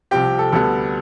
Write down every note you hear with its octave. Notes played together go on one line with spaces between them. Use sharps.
C2 C3 F3 C4 G4 G5
A4
D2 D3 G3 B3 A4